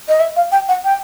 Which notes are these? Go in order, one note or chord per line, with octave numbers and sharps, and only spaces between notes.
D#5
E5
F5
G5
F#5
G5